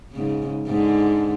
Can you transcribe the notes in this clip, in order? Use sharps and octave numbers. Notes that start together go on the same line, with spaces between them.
G#2 C#3
G#2 D3